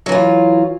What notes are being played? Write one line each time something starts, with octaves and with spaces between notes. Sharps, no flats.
E3 F#3 F4